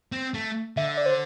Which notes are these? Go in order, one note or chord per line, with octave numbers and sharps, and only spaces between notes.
C4
A3
D3 E5
E5
D5
C5